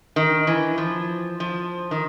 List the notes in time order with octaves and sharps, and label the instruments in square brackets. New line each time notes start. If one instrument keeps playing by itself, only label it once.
[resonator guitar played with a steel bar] D#3
E3
F3
F3
D#3